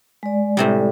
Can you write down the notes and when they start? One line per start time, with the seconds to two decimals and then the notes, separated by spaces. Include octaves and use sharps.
0.23 G#3 D5
0.57 A2 C3 G3